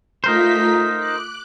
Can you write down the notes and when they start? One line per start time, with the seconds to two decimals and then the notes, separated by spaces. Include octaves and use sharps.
0.24 A3 D#4 F4 A#4 C5 B6
0.96 D6 F#6